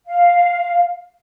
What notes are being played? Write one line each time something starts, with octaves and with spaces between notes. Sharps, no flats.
F5